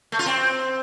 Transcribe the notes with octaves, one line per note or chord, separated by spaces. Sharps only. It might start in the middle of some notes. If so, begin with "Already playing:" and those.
A3
F4
C4